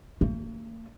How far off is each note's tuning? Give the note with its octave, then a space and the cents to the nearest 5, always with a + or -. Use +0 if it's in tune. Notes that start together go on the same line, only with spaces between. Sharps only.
A#3 -45